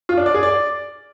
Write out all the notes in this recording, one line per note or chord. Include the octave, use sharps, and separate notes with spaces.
F4
D4
D5
G#4
D5